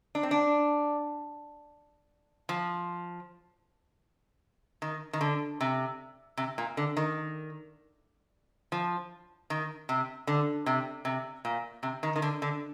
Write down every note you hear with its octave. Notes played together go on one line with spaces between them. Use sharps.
D4
C4
D4
F3
D#3
D#3
D3
C3
C3
A#2
D3
D#3
F3
D#3
C3
D3
C3
C3
A#2
C3
D#3
D#3
D3
D3